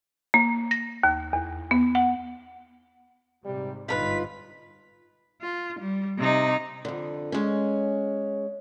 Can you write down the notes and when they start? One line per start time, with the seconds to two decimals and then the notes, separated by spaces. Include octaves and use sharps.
0.34 A#3
0.71 A#6
1.03 D#2
1.33 E2
1.71 B3
1.95 F#5
3.45 G#2 C3 G3
3.88 G1 G#2 D#4 F4 A#4 B4 B6
5.42 F4
5.80 G3
6.18 C3 D#4
6.85 F2 D3
7.32 G#3 C#4